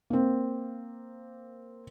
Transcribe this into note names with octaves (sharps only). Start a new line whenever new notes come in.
A#3 C4